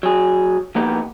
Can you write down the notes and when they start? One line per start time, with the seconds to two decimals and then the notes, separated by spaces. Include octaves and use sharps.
0.03 F#3 G#4
0.75 F3 A#3 B3 D#4 G4